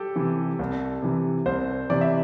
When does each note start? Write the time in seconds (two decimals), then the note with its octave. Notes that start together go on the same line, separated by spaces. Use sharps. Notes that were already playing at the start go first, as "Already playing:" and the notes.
Already playing: G4 A4
0.15 C3 E3
0.59 C2
1.02 C3 E3
1.46 C2 C5
1.90 C3 E3 D5
2.01 E5